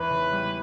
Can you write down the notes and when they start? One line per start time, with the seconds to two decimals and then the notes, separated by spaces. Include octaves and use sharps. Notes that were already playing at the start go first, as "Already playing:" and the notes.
Already playing: E2 B4
0.10 C#3
0.32 G3